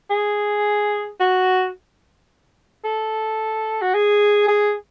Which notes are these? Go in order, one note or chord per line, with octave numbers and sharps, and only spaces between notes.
G#4
F#4
A4
F#4
G#4
G#4